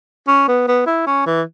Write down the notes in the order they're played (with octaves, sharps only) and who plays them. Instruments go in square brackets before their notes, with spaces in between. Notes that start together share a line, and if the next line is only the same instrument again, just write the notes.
[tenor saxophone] C#4
B3
B3
E4
C#4
E3